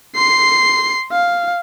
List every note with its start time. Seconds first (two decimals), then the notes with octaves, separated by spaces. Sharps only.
0.15 C6 C7
1.12 F5